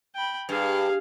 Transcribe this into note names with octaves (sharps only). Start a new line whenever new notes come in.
G5 B5
G2 G#4 F5